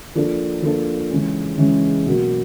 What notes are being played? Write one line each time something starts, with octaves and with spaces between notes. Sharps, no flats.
F3 A#3 D4 F4 A4
F3 A#3 D4 F4 A4
C#3 E3 G#3 C#4
C#3 E3 G#3 C#4
B2 F#3 A#3